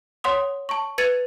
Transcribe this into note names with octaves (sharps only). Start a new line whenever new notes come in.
C#5 F#5 C6 D#6
A5 C#6
B4 G#6 A6 C#7 D#7 F7